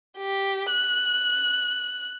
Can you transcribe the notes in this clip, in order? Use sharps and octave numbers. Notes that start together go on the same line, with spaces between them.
G4
F#6